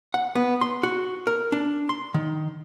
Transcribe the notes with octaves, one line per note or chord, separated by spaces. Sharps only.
F#5
B3
C6
F#4
A#4
D4
C6
D#3